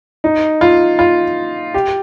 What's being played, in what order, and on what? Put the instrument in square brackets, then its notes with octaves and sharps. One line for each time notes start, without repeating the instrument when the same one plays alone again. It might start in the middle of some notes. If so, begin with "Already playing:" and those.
[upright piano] D#4
F4
F4
G4